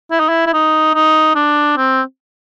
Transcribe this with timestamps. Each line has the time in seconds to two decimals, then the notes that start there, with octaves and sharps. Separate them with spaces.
0.11 E4
0.20 D#4
0.29 E4
0.46 E4
0.53 D#4
0.95 D#4
1.35 D4
1.77 C4